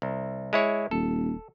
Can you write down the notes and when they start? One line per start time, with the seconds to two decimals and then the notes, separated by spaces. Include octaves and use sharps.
0.02 C2
0.53 G#3 E4 C#5
0.91 D#1 A4